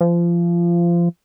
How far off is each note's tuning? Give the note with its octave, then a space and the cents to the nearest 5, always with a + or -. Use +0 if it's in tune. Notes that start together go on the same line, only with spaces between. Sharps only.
F3 -25